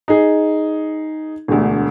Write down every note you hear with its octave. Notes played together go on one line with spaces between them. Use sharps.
D#4 G#4
E1 D2